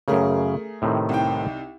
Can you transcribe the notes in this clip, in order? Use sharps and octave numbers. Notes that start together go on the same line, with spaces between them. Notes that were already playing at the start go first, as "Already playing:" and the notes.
F#2 C#3 A3 G#4 A#4
A2 C3 D#3
C2 D#4 G5